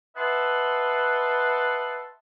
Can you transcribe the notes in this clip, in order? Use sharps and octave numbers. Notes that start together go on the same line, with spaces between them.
B4 D#5 E5 F#5 A5 C6